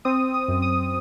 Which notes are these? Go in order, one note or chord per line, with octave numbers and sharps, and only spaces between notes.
C4 D#6
D#6
F#2
D#6